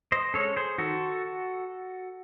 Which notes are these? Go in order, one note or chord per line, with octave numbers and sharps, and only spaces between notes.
C5 D#5
G#3 C#4 A4 C#5
G#4 C5
D#3 F#4 A4